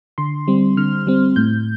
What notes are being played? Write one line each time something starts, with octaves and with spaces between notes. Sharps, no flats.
D3 C6
G3 C4
D3 F6
G3 C4
A2 G6